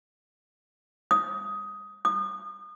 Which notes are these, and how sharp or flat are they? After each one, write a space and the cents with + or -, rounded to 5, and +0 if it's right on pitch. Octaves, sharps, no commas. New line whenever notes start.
D#6 +10
D#6 -30